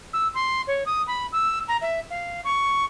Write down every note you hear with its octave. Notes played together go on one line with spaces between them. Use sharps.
E6
C6
C#5
D#6
B5
E6
A#5
E5
F5
C#6